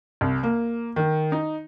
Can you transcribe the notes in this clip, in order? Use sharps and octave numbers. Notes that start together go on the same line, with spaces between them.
C2
A#3
D#3
D#4